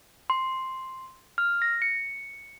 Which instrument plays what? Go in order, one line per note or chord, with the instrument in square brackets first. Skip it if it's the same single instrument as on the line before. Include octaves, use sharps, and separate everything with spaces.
[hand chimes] C6
F6
A#6
C#7